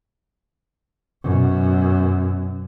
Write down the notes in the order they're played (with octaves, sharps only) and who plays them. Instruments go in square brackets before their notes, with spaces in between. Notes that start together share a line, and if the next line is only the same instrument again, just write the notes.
[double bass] F#2 B2